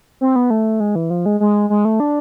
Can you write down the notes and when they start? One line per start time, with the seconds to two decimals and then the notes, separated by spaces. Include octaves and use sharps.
0.21 C4
0.36 B3
0.50 A3
0.80 G#3
0.95 E3
1.10 F3
1.26 G#3
1.40 G#3
1.70 G#3
1.85 A3
2.00 D4